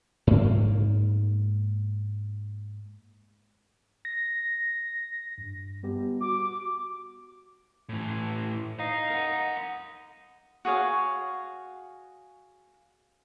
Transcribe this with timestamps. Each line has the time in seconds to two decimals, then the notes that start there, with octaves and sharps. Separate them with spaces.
0.27 G#2 A#3
4.05 A#6
5.38 G2
5.83 G3 B3 G4
6.21 F#4 D6
7.89 A2 E3
8.79 D#4 F5
9.11 A#4 F#5
10.65 F#4 G#4 C#5 F5